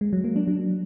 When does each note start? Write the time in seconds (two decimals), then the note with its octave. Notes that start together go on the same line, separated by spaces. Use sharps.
0.01 G#3
0.13 F#3
0.24 A#3
0.36 D4
0.47 F#3